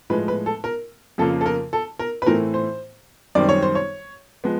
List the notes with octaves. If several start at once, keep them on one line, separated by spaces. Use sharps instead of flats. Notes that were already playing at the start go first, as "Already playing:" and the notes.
A2 F3 G#3 B4
B4
A4
A#4
F2 C#3 F3 A#3 A4
A4
A#4
A4
A#4
B4
A2 E3 A3 C4 A#4
C5
F#2 D#3 G3 C4 D5
C#5
C5
C#5
F3 G#3 B3